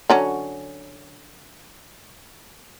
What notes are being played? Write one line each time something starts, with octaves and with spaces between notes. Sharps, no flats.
D3 F#3 C#4